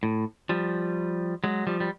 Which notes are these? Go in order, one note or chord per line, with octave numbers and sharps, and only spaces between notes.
A2
F3 G3
F#3 G#3
F3 G3
G3